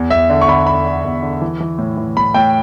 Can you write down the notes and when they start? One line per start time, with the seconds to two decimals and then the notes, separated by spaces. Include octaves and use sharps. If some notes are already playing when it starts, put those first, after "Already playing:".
Already playing: E2
0.10 E2 E5
0.30 D3
0.41 C#6
0.48 D3 B5
0.67 D3 B5
0.86 D3
1.04 E2
1.22 D3
1.42 E3
1.60 E3
1.78 A2
1.97 E3
2.17 A2 B5
2.34 A2 G5